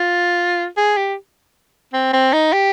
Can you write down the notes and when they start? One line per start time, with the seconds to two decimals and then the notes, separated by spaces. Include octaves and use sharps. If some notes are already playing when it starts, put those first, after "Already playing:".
Already playing: F4
0.77 G#4
0.97 G4
1.93 C4
2.13 C4
2.33 D#4
2.53 G4